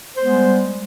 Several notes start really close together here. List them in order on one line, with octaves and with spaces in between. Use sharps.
C5 B3 G#3 G3